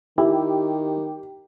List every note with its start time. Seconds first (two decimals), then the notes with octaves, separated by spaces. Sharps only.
0.18 D#3 E4 G4